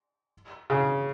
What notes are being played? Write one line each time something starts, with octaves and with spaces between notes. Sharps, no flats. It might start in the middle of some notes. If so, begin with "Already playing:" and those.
C#3